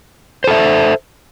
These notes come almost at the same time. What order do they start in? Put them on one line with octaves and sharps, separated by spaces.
C5 A4 E5